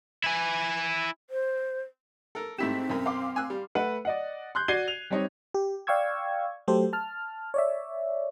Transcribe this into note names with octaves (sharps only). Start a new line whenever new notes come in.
E4 G#5
C5
A4 A#4
G#2 A3 C4 E4 G4 B6 E7
B1 F#2
F5 C6 D6
G#5 E6 F#6
G3
A3 B4 F#5
D5 D#5 F#5
C6 F#6 G6
F#4 D5 G#6 C7 D#7 G7
F7
G3 C4 D#4 C#5 D#5
G4
D5 F5 G5 C#6 E6 G#6
F#3 A3 G4 A4 C5
A5 F6
C#5 D5 E5